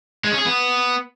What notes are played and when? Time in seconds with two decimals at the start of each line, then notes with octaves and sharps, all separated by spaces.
0.24 G#3
0.31 C#4
0.39 G#4
0.46 B3